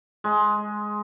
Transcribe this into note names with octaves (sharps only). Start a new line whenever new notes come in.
G#3